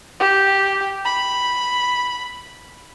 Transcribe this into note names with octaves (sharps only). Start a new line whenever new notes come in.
G4
B5